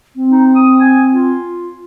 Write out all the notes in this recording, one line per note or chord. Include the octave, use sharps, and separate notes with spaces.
C4
D#4
D#6
G#5
F4